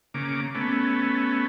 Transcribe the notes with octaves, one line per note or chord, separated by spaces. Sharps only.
C#3 A#3 D6
A3 B3 C#4